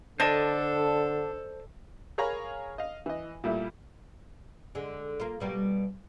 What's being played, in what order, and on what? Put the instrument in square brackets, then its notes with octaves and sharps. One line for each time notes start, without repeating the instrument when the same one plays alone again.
[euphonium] D3 [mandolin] D4 [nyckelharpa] A4 [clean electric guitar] C5 D#5 A5
[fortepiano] G#4 A#4 C#5 F5 A#5 B5
D#5 F5
E3 D#5
A#2 G3 A3 E4
[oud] D3 G#3
A#3 F4
B2 G3 A#3